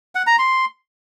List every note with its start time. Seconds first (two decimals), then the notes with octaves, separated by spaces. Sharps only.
0.15 F#5
0.27 A#5
0.39 C6